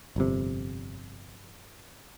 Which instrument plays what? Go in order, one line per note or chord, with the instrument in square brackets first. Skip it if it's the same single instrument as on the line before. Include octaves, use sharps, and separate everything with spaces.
[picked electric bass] G1 F2 C3